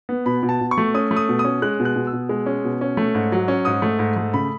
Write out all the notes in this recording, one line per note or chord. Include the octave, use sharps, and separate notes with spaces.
B3
B2 B5
B2
A5
B2
C#6
A3
C#4 D#6
A3
D#6
B2
D#6
C#4
G#3 F#6
B2
F#6
B2
E6
B2
G#3
C#4
B2
C#4
A3
G#2
F#3
C#4
G#2 D#6
A3
G#2
A3
C#3 B5